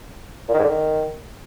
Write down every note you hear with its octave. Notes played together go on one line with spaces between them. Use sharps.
A#2
D#3
G#2
D3
D#3